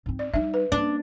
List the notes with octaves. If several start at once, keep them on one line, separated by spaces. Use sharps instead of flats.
G#2 C4
D5
G3 D#4 E5
B4
A#3 C#4 D4